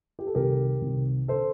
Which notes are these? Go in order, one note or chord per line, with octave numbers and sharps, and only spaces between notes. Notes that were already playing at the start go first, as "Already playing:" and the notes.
G4
A4
C2 C3 D#3 G4 A#4
C2 C3 D#3
D3 A4 C5